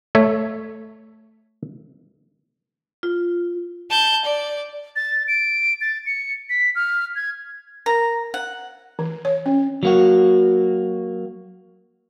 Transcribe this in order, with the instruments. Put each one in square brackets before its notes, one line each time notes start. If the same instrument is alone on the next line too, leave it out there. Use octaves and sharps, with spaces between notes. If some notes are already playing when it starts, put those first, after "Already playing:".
[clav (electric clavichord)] A3 C#5 E5
[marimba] F4
[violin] A5 G6
D5
[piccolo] A6
D7
A6
C#7
B6
F6
G#6
[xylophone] A#4 A#6 [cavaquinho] A#5
[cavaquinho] F#5
[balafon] E3
C#5
C#4
[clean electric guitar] F#3 A#3 F#4